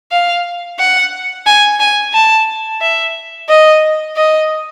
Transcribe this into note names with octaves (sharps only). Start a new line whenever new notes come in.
F5
F#5
G#5
G#5
A5
E5
D#5
D#5